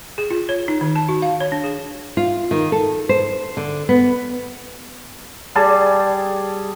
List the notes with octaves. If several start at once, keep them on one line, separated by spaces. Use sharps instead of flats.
G#4
F4
C#5
D#4
D#3
A5
F#4
F5
C#5
D4
G#4
F4
D#3
A4
C5
D3
B3
G3 G#4 A5